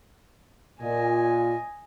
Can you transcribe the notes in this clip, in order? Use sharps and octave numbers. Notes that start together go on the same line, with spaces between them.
A#2 D#5 G#5